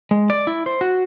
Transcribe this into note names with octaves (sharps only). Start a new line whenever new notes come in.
G#3
D5
E4
C5
F#4